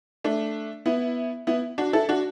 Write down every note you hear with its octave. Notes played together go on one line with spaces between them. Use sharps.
A3 D4
B3 E4
B3 E4
D4 F#4
E4 A4
D4 F#4